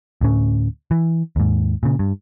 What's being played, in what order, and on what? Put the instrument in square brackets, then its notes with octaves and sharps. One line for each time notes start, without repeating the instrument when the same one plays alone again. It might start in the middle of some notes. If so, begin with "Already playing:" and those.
[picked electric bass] D2 A2 C#4
E3
D#2 G#2
A#2 C#3
G2